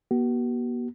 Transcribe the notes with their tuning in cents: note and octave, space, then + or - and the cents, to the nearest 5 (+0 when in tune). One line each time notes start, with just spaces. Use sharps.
B3 -45 F#4 +40